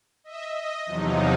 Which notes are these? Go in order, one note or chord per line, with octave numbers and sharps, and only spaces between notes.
D#5 E5
D#5
E2 C3 F3 F#3 D#4